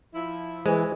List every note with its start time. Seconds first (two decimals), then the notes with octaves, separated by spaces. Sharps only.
0.14 F3 E4
0.66 E3 G#3 C5